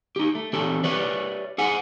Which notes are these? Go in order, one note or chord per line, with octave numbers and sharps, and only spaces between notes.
D#4 G4
A3
E3 C4 G4 A4 A5
G4 B4 C#5 D5 E5
G#4 F#5 G#5